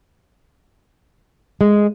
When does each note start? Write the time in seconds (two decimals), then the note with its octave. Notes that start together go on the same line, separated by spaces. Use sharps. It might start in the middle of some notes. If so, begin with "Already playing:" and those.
1.61 G#3